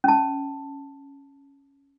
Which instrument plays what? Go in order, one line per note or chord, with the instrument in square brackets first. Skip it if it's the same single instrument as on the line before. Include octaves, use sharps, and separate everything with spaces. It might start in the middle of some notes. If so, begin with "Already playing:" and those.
[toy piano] C#4 A5